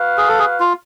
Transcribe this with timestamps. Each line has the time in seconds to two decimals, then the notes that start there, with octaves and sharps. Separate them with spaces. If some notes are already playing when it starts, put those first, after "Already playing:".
Already playing: F#4 B4 F5
0.17 G#4
0.28 A4
0.39 G#4
0.60 F4